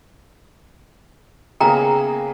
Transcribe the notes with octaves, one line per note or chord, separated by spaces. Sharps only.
C#3 A#3 B3 G#4 G5 A#5